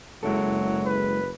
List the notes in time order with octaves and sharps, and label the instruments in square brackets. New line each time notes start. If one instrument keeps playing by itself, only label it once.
[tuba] F#1 [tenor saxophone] F#3 [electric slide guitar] G#3 E4 A4
[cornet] B4